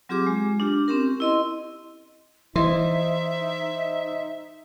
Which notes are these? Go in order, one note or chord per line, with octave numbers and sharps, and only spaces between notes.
F#3 C4 F4 G4 G#4 D6
G#3
D4 F4 G4
C4 C#4 G4 A#4
E4 D#5 C6
E3 D#4 C5 D#5 E5 C6